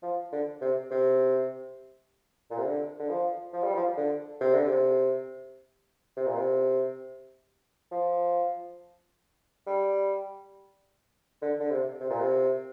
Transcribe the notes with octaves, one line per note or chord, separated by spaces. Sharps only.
F3
D3
C3
C3
A#2
C3
D3
D3
F3
F3
G3
F3
D3
C3
D3
C3
C3
A#2
C3
F3
G3
D3
D3
C3
C3
A#2
C3